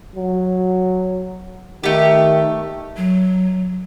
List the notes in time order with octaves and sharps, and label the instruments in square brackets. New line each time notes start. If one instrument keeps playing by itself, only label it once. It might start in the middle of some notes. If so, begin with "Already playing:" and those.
[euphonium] F#3
[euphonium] D#3 [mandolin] A3 G4
[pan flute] F#3